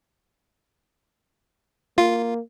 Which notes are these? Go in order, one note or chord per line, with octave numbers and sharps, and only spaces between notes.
A#3 F4